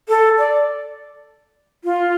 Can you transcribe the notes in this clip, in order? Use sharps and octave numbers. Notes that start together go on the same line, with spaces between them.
A4
D5
F4